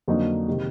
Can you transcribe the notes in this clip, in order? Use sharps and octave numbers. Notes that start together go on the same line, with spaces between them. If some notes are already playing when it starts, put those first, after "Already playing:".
F2 D3 F#3 A#3 D#4
C3 D#3 G#3